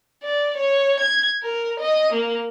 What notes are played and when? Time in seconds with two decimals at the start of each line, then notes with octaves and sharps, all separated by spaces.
0.23 D5
0.57 C#5
1.00 G#6
1.43 A#4
1.80 D#5
2.13 A#3